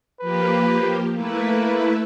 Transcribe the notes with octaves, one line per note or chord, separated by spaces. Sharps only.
F3 A#3 G4 B4
A3 A#3 E4 B4